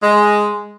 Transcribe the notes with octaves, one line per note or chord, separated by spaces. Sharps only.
G#3